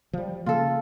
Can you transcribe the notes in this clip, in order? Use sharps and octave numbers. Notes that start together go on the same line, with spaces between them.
F3 G3
C#3 A#3 F4 A4